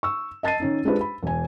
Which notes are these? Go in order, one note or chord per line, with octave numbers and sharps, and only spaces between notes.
C#6 E6
D#5 A5 A6 C7 D#7
D#3 C#4 D#4
G#3 D4 F4 G4 B4 C5
B5
E1 G#5